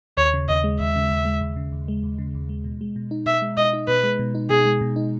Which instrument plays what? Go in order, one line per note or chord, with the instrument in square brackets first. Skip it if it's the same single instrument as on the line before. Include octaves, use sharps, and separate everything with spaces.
[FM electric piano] D#2 [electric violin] C#5
[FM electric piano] C#3
[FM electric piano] D#2 [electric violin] D#5
[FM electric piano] G#3
[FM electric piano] D#2 [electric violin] E5
[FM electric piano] C#3
D#2
G#3
D#2
C#3
D#2
G#3
D#2
C#3
D#2
G#3
B2
G#3
B2
D#4
[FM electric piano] B2 [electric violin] E5
[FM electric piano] G#3
[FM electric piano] B2 [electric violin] D#5
[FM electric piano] D#4
[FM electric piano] B2 [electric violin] B4
[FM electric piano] G#3
B2
D#4
[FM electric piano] B2 [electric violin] G#4
[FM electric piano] G#3
B2
D#4